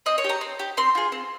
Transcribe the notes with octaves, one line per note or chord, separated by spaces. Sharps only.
C4 D#5
C#5
G4 A#5
C4
G4
C4 C6
F4 G#4
C4